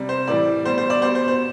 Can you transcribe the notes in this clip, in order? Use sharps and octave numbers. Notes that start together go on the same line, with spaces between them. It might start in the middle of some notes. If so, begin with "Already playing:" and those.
Already playing: C3 G3
C5
A2 E3 G3 D5
B2 G3 C5
C5
D5
B2 G3 C5
C5
C5